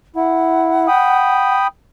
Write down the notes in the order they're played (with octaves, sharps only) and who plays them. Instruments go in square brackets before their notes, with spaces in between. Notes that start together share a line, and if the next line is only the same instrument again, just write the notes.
[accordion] E4 [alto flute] F#5
[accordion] G5 B5 D#6